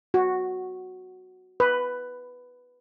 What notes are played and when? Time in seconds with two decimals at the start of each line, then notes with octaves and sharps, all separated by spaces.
0.14 F#4
1.60 B4